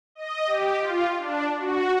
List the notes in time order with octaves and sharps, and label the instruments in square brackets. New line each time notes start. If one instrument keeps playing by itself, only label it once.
[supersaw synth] D#5
G4
F4
D4
F#4